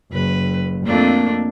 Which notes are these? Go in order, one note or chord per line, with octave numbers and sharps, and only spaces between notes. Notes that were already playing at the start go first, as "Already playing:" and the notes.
F#1 B4
F2 A3 A#3 D4